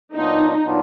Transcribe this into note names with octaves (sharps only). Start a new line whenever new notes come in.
A#2 F#3 B3 D4 D#4 F4
A#2 F#3 B3 D4 F4